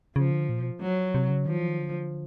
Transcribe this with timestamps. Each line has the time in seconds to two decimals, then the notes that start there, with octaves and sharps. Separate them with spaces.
0.16 C#3 F3
0.32 D3
0.49 A#2
0.59 B2
0.81 F#3
1.15 C3
1.30 C#3
1.46 D#3 F3
1.58 E3
1.68 D#3
1.80 D3